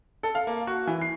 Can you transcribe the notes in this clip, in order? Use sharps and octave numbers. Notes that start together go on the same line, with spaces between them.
A4
F5
A#3
F#4
E3
C7